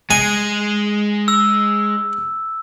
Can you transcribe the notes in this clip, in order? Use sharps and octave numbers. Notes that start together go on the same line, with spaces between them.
G#3 G#5
E6